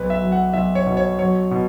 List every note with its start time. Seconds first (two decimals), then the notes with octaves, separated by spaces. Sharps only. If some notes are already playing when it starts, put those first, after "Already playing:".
Already playing: B1 B4
0.10 E5
0.21 F#3
0.32 F#5
0.53 B1 E5
0.75 C#5
0.87 B2
0.97 C#5
1.19 F#3 C#5
1.51 B2